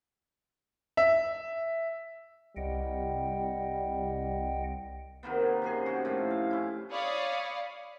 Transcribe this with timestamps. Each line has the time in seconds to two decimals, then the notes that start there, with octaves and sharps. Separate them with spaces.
0.97 E5
2.56 C2 G3 D#5 F#5 G5
5.23 C3 D#3 A#3 B3
5.62 F#2 C3 G#4
5.86 F#4 G4
6.05 A2 F3 D5
6.30 F5
6.51 C#4 E4
6.91 C#5 D5 F5 B5 C#6 D#6